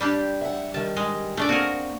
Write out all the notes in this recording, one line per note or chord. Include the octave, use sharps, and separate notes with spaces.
G3 D4 G4
E5 F#5
D#3 G3 A5
G#3
A3 C#4 D4 G#4 D5
A#3 C4 F#4 G#4 A#4